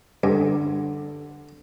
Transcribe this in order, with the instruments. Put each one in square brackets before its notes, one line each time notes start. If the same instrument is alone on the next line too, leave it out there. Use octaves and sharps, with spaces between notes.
[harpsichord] G2 [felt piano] D3